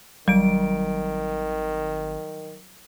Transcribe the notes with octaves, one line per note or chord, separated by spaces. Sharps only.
G#1 D#3 F#3 G3 D7